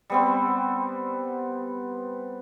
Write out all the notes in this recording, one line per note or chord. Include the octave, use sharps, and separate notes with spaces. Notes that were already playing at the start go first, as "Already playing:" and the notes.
G3 B3 C4